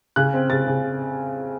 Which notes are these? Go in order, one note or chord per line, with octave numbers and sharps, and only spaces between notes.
C#3 F#6
C4
C#3 A6
C#3